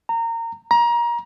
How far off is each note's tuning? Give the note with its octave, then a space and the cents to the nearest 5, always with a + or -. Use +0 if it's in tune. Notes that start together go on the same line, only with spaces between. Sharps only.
A#5 -25
A#5 +25